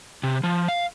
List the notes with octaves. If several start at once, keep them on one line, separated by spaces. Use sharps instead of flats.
C3
F3
F5